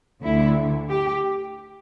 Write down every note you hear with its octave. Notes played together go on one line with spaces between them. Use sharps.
D2 D3 E4
G4